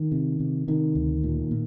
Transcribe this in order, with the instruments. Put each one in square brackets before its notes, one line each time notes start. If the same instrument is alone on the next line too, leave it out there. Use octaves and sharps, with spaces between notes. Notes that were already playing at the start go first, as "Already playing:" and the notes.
Already playing: [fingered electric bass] D#3
C3
C3
C3 D#3
D2
A#2
A#2